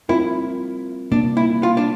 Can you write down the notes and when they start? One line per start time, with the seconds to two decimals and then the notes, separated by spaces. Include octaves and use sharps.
0.09 G3 C4 E4 F4 A#4
1.11 C3 G3 A#3 D4
1.37 E4
1.63 F4
1.77 D4